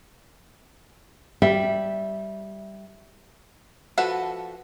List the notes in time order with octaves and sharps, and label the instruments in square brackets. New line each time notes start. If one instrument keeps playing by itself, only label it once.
[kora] G3 [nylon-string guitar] E5
[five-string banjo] F3 F#4 A4 B4 F#5